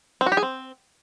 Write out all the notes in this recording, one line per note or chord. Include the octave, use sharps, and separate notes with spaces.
C4
F#4
G4
G#4
C4